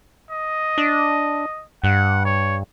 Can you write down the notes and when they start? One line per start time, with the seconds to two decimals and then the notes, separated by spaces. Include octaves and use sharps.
0.31 D#5
0.78 D4
1.84 G2 F#5
2.25 C#5